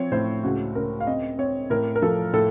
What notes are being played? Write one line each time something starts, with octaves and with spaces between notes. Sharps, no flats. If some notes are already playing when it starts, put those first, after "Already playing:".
Already playing: F3 C4 C#5
A2 C5
C#2 F#4
C#2 A#4
F5
C4 D#5
C4 C#5
A2 A#4
A#4
F3 A4
A2 A4